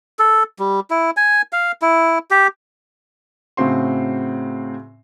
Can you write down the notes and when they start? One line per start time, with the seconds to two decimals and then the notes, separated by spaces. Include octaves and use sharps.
0.19 A4
0.59 G3
0.91 E4
1.17 G#5
1.53 F5
1.82 E4
2.31 G4
3.57 A2 C#3 C4 F#4 C6